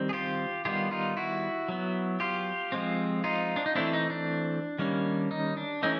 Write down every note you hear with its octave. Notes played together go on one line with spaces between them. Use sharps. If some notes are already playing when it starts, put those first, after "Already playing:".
Already playing: D#3 G3 C4
G#4
F4 G4
D#3 G3 B3 F4 G4
D#4 F4
E4 F#4
F#3 B3
F4 G4
F3 G#3 C4
D#4 F4
D4
D#4
E3 A3 C4 D4 E4
D#4
D4
D#3 G3 A#3 C#4
D#4
D4
E3 A3 C#4 D#4